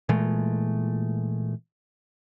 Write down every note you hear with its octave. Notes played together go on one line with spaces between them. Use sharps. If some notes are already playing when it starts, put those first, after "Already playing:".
A#2 E3 G#3 A3